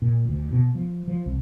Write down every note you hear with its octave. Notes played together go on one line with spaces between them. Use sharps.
A#2
D2
B2
F3
F3
C2